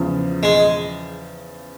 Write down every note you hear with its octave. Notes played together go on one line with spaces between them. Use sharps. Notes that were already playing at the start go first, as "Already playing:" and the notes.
Already playing: E2 C#3 F3
G#3